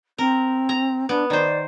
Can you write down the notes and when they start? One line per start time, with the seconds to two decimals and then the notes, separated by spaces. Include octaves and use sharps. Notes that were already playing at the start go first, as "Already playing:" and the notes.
0.18 C4 A#4
0.69 A#5
1.09 B3 D4
1.30 D#3 C5 D5